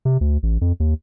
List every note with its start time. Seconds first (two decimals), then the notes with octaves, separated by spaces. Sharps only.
0.05 C3
0.21 D2
0.43 A1
0.61 F2
0.80 D#2